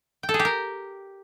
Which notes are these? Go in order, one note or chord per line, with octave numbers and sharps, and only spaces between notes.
G5
A4
G#4
G4
A#4